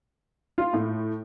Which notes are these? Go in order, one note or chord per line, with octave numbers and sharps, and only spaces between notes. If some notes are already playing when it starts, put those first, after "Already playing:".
F4
A2